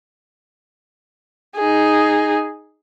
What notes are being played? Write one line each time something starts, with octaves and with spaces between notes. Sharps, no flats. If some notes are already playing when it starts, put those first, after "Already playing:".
D#4 G#4